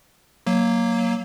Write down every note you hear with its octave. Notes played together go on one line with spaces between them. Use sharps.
F#3 A#3